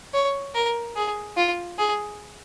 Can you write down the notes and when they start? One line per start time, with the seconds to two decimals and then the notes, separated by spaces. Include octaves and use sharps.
0.13 C#5
0.55 A#4
0.96 G#4
1.37 F4
1.78 G#4